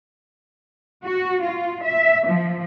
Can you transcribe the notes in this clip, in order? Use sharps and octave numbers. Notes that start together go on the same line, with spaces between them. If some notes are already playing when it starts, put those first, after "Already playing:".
F#4
F4
E5
F3